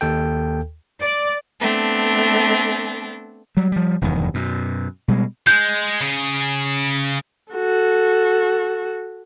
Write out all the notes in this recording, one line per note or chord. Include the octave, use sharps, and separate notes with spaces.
D#2 A4 G5
D5
A3 B3 C4 D4 A4
F#3 G3
F3 G3
F1 E2 G2 D#3
F#2 B2
B2 G3 G#3
G#3 G6
C#3 G#4
F#4 A4